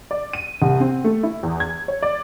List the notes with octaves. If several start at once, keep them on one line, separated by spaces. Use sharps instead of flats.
D5
D#7
C2
C4
A3
E4
E2
G#6
C#5
D5